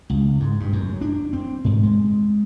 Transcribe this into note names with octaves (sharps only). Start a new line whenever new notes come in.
C#2
G#2
G2
F#2
D4
C4
G#2
G#3